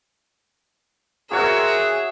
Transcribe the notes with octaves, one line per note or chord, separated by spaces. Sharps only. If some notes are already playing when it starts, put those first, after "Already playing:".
C4 F#4 G#4 A#4 C#5 E5 F#5